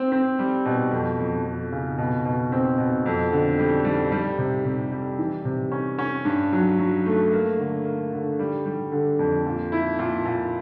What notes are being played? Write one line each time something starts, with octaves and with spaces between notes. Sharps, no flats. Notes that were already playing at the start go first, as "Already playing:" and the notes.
Already playing: C4
C4
G3
B2
F2
F2
F2
C#3
B2
B2
C4
B2
F2
D3
G3
G3
G3
C3
C3
G3
E3
C3
C#4
C#4
G2
F#3
F#3
A3
A#3
D3
A#3
D3
G3
G3
D3
F2
A#2
E4
A#2
A#2